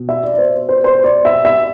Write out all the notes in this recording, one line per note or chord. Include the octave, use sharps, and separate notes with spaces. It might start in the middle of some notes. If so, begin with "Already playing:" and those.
Already playing: B2
E5
D5
D5
C5
C5
C5
D5
E5
E5